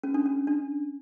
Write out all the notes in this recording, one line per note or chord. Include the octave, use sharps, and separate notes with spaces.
C#4
D4
C#4
D4